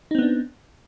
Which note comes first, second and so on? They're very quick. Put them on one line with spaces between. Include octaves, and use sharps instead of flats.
D#4 C4 B3 D4